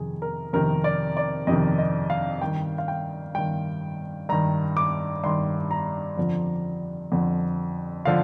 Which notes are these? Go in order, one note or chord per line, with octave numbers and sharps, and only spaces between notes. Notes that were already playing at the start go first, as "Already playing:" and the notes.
Already playing: F2 C3 D#3 G#4
A#4
F2 C3 D#3 A#4
D5
D5
F2 C3 D#3 D#5
D#5
F5
G2 D#3 G5
F5
G5
G2 D#3 G5
G2 D#3 A#5
D6
G2 D#3 C6
A#5
F2 D3 F3
F2 D3 F3
D3 F3 F5